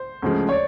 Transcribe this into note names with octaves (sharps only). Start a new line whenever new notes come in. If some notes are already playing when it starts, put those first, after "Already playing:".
Already playing: C5
D2 C#3 F3 G#3
C#5
D5